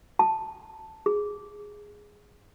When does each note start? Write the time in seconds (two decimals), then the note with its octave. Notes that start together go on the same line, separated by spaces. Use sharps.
0.19 A5
1.06 G#4